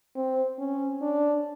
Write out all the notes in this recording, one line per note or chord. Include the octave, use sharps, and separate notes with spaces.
C4
C#4
D4